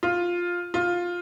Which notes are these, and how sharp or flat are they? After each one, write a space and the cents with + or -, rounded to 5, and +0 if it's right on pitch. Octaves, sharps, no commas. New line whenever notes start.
F4 +5
F4 +10